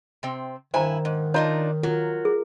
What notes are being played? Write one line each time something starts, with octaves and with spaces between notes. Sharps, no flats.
C3 C4
G2 D#3 E4 C5 G#5 A#5
G#2
D4 D#4 F4 C#5 A#5
F#3 F4 A#4
G#4